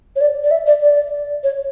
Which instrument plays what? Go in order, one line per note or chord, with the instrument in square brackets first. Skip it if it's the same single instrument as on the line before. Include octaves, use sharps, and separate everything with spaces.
[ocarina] C#5
D5
D5
E5
D5
D5
C#5